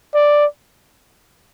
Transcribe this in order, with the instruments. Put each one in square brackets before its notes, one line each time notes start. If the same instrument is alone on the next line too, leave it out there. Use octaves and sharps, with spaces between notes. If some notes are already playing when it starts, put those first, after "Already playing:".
[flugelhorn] D5